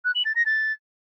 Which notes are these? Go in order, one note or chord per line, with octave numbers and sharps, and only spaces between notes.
F#6
F#7
A6
A#6
A6